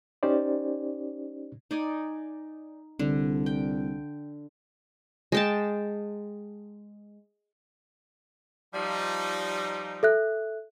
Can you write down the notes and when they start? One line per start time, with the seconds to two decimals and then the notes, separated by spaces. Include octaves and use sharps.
0.23 C#4 D#4 G4 C5 D5
1.71 D#4 D5 G#5
2.99 C2 D3
3.46 G5
5.32 G#3 G5 A5
8.74 F3 G3 D#4
10.03 A4 E5 F#6